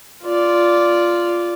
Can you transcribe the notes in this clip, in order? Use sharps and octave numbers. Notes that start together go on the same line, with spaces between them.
F4 D5